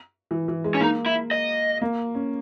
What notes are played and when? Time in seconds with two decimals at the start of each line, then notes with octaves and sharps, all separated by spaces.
0.31 E3
0.48 E3
0.64 G#3
0.74 C#4
0.81 A#3 D#4
1.06 E4
1.31 D#5
1.81 A#3
2.15 C#4